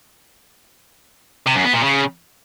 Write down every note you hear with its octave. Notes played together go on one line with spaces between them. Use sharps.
C3
F#2
B3
A#2
C#3